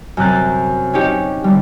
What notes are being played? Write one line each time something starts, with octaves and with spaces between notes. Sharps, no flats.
F#2 C3 F#6 A6
C#4 D#4 G4 C#5
D3 G3